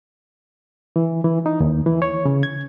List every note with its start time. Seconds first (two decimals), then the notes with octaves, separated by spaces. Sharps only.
0.96 E3
1.24 E3
1.46 D#4
1.60 D#2
1.86 E3
2.02 C#5
2.25 C#3
2.43 G#6